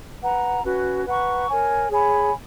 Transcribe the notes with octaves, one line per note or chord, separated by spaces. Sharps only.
B4 F#5 A#5
C#4 F#4 B4
B4 F#5 A#5 C#6
A#4 C#5 G#5
G#4 C#5 G#5 B5